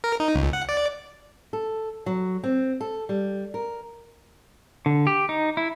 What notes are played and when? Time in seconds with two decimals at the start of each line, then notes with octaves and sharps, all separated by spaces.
0.04 A#4
0.20 D#4
0.35 C#2
0.53 F#5
0.69 D5
1.53 A4
2.06 F#3
2.44 C4
2.81 A4
3.09 G3
3.54 A#4
4.86 D3
5.07 G4
5.29 D#4
5.57 E4